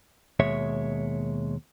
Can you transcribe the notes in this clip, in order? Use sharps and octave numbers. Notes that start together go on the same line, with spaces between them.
D#2 B2 G#3 C#5 E5